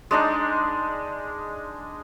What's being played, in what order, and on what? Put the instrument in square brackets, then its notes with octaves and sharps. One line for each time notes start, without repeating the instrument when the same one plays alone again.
[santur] G#3 D4 D#4